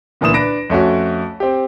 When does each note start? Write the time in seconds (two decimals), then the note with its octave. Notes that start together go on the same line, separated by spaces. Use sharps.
0.21 D2 A#2 E3 D#6 E7
0.33 D4 B4 A#6 D7
0.70 F2 A3 C#4 F#4
1.40 C4 G4